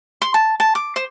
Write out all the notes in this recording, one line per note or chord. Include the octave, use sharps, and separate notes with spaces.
C6
A5
A5
D6
C5